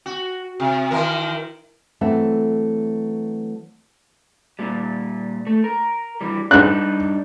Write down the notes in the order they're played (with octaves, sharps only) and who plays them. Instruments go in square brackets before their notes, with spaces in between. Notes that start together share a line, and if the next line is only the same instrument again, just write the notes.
[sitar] F#4
C3
D#3 E3 A#4
[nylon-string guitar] E3 F#3 A3 C4 A4 E5
[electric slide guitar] A#2 G3
A3
A#4
E3 G3
[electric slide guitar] G3 D4 D#4 [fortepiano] F#6